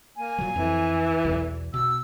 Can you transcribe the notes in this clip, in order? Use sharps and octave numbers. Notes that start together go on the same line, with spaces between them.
A#3 G#5
A#2 F#3
F2 E3
B1 E2
B2 E6